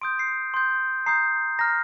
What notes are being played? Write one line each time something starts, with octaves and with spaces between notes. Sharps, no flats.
C6 D#6 G6 D7
C7
C6 D#6 G6
A#5 D#6 G6 C7
A#5 F6 A#6